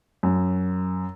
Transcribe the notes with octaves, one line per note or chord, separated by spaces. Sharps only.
F#2